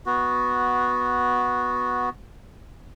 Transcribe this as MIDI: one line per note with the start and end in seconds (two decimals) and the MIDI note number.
0.06 2.09 59
0.06 2.09 66